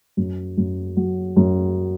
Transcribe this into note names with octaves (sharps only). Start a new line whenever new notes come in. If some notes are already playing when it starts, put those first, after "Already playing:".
F#2
F#2
F#3
F#2